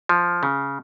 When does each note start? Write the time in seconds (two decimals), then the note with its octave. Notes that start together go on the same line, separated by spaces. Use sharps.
0.09 F3
0.43 C#3